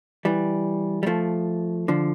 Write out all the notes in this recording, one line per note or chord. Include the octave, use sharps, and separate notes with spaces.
E3 G3
G3
F3 A3
D3 F3